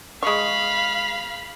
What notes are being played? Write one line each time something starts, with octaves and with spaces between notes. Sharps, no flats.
G#3 F5 B5 C#6